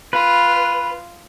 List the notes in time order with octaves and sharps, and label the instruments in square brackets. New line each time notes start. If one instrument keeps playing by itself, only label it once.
[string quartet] F4 [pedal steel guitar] B4